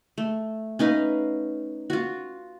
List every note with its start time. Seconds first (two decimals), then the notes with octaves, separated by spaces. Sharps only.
0.18 A3
0.79 C#4 D#4 B4 F5
1.90 F4 F#4